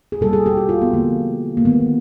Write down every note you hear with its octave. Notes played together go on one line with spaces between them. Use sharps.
G#4
B2 G3 A#3 A4
G#4
G4
F#4
F4
B3
D3 F3 A3 A#3
A#3
D#3 G#3 B3